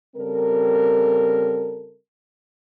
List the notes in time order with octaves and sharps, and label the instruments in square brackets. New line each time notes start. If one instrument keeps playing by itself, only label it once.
[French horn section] C#3 G3 C4 A4 A#4